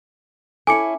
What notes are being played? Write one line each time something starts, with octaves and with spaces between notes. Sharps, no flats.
C#4 E4 A4 G#5 D6 C#7